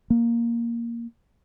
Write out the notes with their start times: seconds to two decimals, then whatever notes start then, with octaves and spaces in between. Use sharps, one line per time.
0.10 A#3